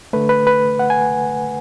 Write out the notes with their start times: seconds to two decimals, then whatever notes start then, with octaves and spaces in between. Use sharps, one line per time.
0.13 D3 A3 B4
0.29 B4
0.47 B4
0.79 F#5
0.90 G#5